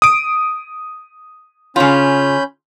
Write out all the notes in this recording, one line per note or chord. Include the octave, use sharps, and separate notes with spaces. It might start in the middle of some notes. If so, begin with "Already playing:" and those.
D#6 D7
C#3 C#4 F4 B5 G6